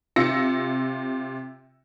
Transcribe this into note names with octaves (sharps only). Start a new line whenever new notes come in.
C3 F4 E6 A#6 C#7